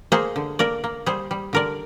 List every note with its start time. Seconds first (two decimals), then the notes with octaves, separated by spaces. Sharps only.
0.12 A#3 G#4 C5
0.36 D3
0.59 A#3 A#4 D5
0.84 A#3
1.06 G3 G#4 C5
1.31 G3
1.53 D3 A#4 D5